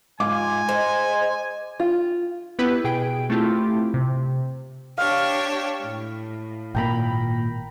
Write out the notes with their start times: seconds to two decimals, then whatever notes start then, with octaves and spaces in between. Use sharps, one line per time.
0.20 G#2 F4 G#5 D6
0.69 G#3 D#4 C5
1.80 F4
2.59 B3 E4 G4 B4
2.84 B2 G#4 G5 D7
3.30 A3 C4 E4 F4 G4
3.94 C3
4.98 D4 G4 C#5 F5
5.81 A2
6.75 G#1 A#2 A#3 G5 A#5 B5